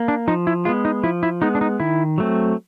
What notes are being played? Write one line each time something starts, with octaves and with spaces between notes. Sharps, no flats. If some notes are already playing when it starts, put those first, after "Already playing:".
Already playing: A#3
D4
F3 D#4
E4
G#3 B3 F4
D#4
F3 E4
E4
G#3 B3 D#4
D4
D#4
D#3 E4
F#3 A3 C4